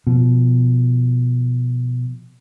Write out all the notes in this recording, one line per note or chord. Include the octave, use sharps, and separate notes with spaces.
B2 F3